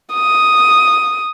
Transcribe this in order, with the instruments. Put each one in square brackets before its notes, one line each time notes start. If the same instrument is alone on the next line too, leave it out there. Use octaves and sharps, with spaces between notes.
[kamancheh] D#6